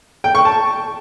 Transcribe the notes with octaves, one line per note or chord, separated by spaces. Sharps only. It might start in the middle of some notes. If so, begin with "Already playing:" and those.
G5
C#6
A5